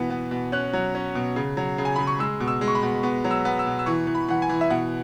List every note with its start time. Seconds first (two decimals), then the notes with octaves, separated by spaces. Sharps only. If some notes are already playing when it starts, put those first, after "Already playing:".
Already playing: B2 E3 B3
0.10 B3
0.31 B2
0.52 C#4 F#6
0.73 F#3
0.95 C#4
1.15 B2
1.36 C#3
1.57 F#3
1.78 C#3
1.85 G#5
1.96 C#3 B5
2.07 C#6
2.19 G#3 E6
2.40 B2
2.48 E6
2.61 G#3
2.68 C#6
2.75 B5
2.83 B2
3.03 B3
3.24 F#3
3.31 E6
3.45 B3
3.59 E6
3.66 B2
3.79 E6
3.86 E3 C#6
4.07 E3
4.15 B5
4.28 E3 F#5
4.42 G#5
4.49 E3
4.61 E5
4.70 B2 F#5